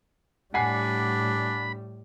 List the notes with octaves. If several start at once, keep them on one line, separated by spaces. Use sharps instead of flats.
A2 G3 D4 F#5 G#5 B5 C7